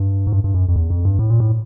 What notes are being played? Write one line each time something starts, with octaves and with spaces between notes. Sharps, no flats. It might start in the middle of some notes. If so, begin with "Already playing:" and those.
Already playing: G2
G#2
G2
G2
F#2
F2
E2
F2
G2
A2
A#2
A2